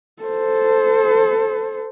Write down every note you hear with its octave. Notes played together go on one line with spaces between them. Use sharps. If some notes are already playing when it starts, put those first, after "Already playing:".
A4 C5